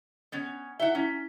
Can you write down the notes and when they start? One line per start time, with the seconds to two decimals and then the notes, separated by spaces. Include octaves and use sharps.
0.32 B3 C#4
0.80 D#4 E4 E5 F#5 G7
0.95 C#4 E4 B6